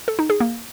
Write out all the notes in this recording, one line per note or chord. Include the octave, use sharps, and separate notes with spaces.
A4
D#4
G#4
A#3